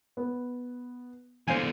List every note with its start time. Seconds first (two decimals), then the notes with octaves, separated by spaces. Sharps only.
0.17 B3
1.48 E2 D3 C5 F5 G#5